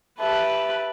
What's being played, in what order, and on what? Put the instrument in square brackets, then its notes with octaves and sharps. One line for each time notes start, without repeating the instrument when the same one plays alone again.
[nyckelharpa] G4 B4 [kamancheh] E5 A5